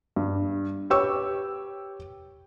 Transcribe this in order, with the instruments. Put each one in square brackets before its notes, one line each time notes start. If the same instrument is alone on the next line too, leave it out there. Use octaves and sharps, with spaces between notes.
[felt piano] G2
G4 B4 C#5 G5 C#6 E6